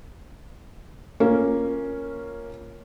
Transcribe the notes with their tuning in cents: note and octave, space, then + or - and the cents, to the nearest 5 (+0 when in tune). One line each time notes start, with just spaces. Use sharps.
A#3 +0 C#4 +0 F4 +0